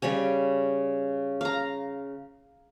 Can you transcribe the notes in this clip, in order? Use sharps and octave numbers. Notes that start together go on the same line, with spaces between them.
C#3 G3 C#5 G#5
F5 A#5